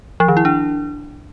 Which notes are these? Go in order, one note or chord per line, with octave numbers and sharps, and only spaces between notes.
F3
D#3
E4
D4